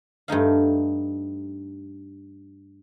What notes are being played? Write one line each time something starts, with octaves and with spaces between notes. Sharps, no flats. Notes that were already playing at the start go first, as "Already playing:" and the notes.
G2 A3 D#4 F5